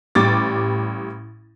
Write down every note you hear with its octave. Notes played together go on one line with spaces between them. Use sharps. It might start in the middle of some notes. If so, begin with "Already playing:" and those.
A1 G3 D6 A6